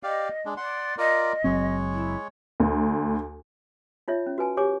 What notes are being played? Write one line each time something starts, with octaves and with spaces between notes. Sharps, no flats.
G4 D5 D#5 F5
G#3 D4
D5 F#5 C6
F4 A#4 D5 D#5
F#1 F#3 G#3 C4 C#5
E4
D2
D#4 F4 C#5 E5
C#4
F#4 B4 G#5 A5
G4 C#5 G#5 D6